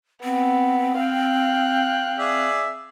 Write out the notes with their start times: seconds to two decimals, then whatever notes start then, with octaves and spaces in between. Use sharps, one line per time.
0.24 B3 C4
1.00 F5 G5 F#6
2.18 G#4 D5 E5